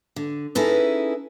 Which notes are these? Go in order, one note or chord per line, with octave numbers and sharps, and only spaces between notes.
D3
C#4 D#4 E4 G#4 A4 B4